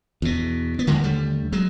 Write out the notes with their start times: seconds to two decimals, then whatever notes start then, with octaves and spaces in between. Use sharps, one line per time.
0.22 E2 B2
0.79 B3
0.87 D#2 D3 G#3 A#3
1.03 G3 A3
1.52 F#3 G#3